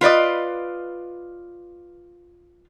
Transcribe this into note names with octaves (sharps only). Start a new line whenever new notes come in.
F4 B4 D5 D#5